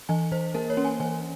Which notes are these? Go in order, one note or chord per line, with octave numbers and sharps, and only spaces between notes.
E3 G#5
E3 C5
A#3 A#4
C#5
C#4
G#5
E3 G#5